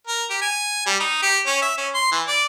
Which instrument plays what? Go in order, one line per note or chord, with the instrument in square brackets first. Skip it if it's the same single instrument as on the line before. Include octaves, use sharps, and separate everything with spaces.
[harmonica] A#4
G4
G#5
G3
D#4
G4
C#4
E5
C#4
C6
E3
D5